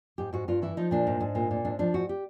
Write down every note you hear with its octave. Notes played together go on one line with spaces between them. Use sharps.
G#2 G4
G#2 F#4
G2 F4
E3 E4
F3 D#4
A#2 D4
G#2
G#2
A#2
A#2
G#2 D4
F3 D4
G#2 F#4
G4